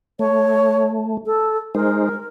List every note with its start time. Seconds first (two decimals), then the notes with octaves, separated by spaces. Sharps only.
0.19 A3 C#5
1.26 A4
1.75 G#3 D#4 A#4 C5